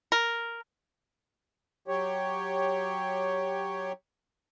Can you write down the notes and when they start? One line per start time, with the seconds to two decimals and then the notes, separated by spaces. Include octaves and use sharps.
0.12 A#4
1.88 F#3 G4 C#5